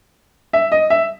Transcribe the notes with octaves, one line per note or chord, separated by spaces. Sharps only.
E5
D#5
E5